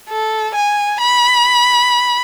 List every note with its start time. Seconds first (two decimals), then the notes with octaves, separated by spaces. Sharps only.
0.09 A4
0.55 G#5
1.01 B5